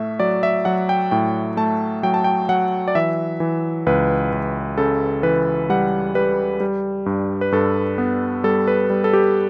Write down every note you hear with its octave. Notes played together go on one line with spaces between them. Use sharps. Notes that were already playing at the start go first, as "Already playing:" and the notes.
Already playing: A2 A3 E5
F#3 D5
E5
F#3 F#5
G5
A2 G5
A3 A5
F#3 G5
A5
G5
F#3 F#5
D5
E3 E5
E3
C#2 B4
C#2
C#3 A4
E3 B4
G3 F#5
G3 B4
G3
G2
B4
G2 A4
B3
G3 A4
B4
G3
A4
G4